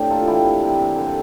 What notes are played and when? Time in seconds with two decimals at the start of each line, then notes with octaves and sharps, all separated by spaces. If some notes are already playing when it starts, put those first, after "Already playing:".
Already playing: A2 C4 D4 G4
0.10 A#3 F4 A4
0.27 E3 E4 G4
0.45 C3
0.62 C3
0.79 C3
0.96 D3